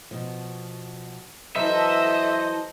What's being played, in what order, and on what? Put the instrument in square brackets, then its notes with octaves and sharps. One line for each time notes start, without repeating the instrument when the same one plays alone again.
[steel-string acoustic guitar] B2 F3
[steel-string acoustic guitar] E3 F#3 [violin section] A4 D#5 [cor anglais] C5 [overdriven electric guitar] E5